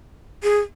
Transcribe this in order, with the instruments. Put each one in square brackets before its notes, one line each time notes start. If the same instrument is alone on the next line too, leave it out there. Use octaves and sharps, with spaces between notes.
[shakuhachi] G#4